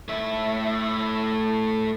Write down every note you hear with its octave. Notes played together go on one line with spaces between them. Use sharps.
A2 E5